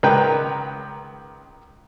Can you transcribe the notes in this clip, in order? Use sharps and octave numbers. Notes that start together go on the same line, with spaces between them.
C#2 D#3 A#4 B4 G5 A#5